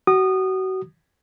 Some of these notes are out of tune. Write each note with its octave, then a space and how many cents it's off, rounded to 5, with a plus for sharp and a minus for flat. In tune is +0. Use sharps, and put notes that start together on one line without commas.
F#4 +30 D#6 -25